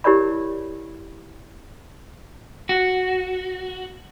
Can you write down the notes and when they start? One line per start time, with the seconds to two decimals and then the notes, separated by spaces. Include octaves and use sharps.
0.04 E4 G4 A#4 C#5 D5 B5
2.69 F#4